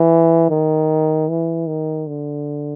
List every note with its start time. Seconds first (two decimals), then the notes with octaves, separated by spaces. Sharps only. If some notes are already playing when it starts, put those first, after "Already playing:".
Already playing: E3
0.50 D#3
1.29 E3
1.67 D#3
2.07 D3